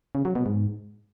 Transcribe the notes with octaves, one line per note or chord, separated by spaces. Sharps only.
C#3
F#3
B2
G#2